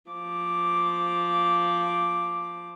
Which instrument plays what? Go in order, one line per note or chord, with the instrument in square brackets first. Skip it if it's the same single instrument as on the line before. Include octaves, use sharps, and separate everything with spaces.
[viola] F3 D6